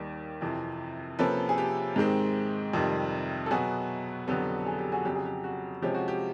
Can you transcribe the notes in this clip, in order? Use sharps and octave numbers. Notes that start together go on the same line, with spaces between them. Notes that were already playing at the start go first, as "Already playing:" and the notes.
Already playing: D#2 D#3 G3
F2 C3 E3
C3 F3 A#3 C#4 A4 B4
G#4
G4
G#2 D#3 G#3 C4
F2 C3 D#3 G3
A4
B2 F#3 B3 F#4 G#4
F2 D3 F#3 B3 G4 A4
G#4
G4
F#4 G#4
F2 C#3 F#3 G4
G#4
G4
F#4
C3 F3 G#3 C#4 G4
F#4
G4